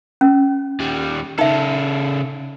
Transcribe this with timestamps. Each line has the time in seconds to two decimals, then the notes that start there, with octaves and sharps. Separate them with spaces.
0.21 C#4
0.80 D#2 G3
1.39 C#3 D#4 A4 E5